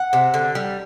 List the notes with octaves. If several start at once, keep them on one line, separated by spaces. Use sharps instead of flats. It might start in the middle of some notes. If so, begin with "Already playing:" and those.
Already playing: F#5
C3
D3
G3